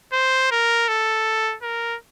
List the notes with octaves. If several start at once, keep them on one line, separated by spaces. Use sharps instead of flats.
C5
A#4
A4
A#4